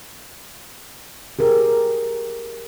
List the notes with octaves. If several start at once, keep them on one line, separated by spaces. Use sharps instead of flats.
G4 G#4 A#4